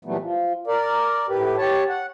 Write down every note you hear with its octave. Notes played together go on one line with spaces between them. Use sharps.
A#2 E3 F#3 G3 A3 B3
F3
A#4 D5
A2 G4 B4
G4 C#5 A5
F#5